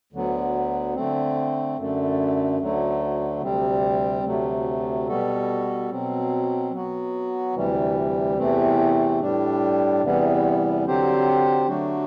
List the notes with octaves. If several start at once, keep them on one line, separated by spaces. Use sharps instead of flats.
D2 D3 F#3 B3
D3 A3 C4
F#2 D3 A3
D2 D3 F#3 A3
D2 C3 G3 C4
D2 C3 F#3 A3
B2 G3 B3 F#4 A4
B2 F#3 C4
F#3 B3 F#4
D2 C3 E3 G3
E2 C3 E3 A3 C4
A2 G3 D4
E2 C3 E3 G3 B3
D3 F#3 C4 G4 C5
D3 F#3 A3 D4 F#4